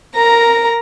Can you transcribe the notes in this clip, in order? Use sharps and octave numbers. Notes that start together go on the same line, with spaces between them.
A#4 A#5